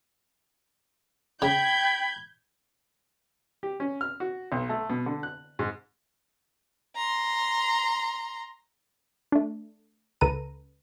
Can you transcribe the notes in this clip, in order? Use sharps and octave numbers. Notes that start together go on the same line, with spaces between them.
C#3 G5 B5 G6 G#6
G4
C#4
F6
F#4
B1
A3
B2
D3
F#6
G#2
A#5 C6
A3 D4
C#2 C#3 A4 B4 A#5 D#7